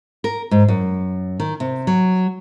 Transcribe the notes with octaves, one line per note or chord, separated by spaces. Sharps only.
A#4
G#2
F#2
D#3
C3
F#3